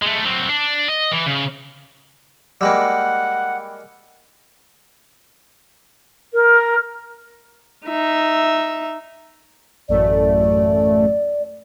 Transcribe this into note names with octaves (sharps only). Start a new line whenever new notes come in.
G#3 A3
F#3 C4
D4
D#5
E3
C#3
G3 G#3 A#3 F#5 G5 B5 E6
A#4
D#4 E5
A1 F#2 A3 D5